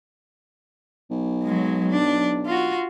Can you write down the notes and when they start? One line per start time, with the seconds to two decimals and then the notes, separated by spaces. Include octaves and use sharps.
1.11 B1
1.44 F#3 G#3
1.91 D4
2.46 F4 F#4